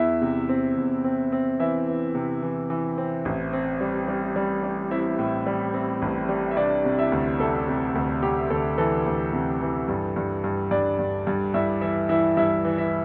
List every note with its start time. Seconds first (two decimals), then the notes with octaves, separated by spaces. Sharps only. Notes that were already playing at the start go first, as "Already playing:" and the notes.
Already playing: E2 E4 E5
0.21 C3
0.49 C4
0.77 E2
1.04 C4
1.32 C4
1.60 E3 E4 E5
1.88 E3
2.15 C3
2.42 E3
2.70 E3
2.98 C4
3.25 A1
3.53 C4
3.81 G3
4.08 G3
4.36 G3
4.63 G3
4.91 C4 E4 E5
5.19 A2
5.47 G3
5.74 C4
6.02 A1
6.29 G3
6.51 E5
6.57 C3 D4 D5
6.84 C3
6.98 E4 E5
7.12 D2
7.40 C3 A4
7.68 C3
7.95 D2
8.22 C3 G4
8.50 D2 A4
8.78 E3 A4
9.06 D2
9.33 C3
9.61 E3
9.88 G2
10.16 G2
10.44 G2
10.71 G2 D4 D5
10.99 G2
11.27 G2
11.54 G2 E4 E5
11.81 E3 E4 E5
12.09 E3 E4 E5
12.37 G2 E4 E5
12.65 E3
12.78 E4 E5